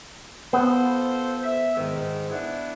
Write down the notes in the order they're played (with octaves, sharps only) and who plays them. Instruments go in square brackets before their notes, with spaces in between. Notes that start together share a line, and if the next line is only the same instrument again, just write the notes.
[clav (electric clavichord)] B3 [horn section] F4 A4 C5
[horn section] E5
G#2 D#3
B3 D4 E4